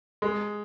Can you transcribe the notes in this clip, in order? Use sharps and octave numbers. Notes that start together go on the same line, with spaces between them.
G#3